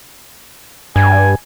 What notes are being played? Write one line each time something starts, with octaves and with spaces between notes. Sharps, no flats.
G2 G#5